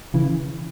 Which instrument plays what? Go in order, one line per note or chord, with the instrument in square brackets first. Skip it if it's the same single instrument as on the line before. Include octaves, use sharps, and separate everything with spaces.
[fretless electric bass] C#3 E3